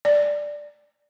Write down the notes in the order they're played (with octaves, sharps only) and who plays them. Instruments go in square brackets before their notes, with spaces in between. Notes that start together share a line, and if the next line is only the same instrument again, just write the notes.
[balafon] D5